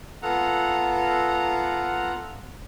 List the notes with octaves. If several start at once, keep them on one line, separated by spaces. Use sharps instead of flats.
B3 F4 A4 F#5 A#5